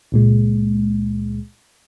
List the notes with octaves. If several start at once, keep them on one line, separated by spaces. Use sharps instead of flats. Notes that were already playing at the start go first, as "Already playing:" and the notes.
C#2 A#2 G#3